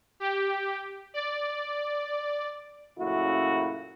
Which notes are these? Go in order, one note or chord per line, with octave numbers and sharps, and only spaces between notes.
G4
D5
F#2 A#2 C#3 A3 E4 F#4